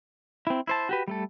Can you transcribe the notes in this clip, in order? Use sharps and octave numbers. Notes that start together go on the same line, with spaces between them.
C4 E4
E4 C5 A5
F#4 G4 B4
G3 A3 A4